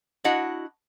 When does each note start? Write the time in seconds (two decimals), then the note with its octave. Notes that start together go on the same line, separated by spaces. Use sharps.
0.24 D4 E4 F#4 D#5 F#5